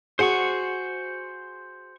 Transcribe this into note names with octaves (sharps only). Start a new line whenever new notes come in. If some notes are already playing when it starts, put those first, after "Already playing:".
F#4 G#4 C5 F#5 C#6